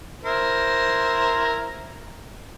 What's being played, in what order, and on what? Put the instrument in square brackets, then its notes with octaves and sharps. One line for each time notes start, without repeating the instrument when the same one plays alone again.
[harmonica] E4 A#4 C5